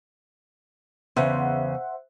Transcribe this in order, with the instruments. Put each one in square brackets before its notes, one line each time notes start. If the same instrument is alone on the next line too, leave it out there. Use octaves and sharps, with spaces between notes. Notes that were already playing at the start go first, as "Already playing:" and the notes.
[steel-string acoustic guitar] E2 C#3 [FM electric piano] C5 E5 F#5